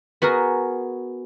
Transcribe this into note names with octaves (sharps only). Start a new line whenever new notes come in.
B3 F#4 G#4 A#4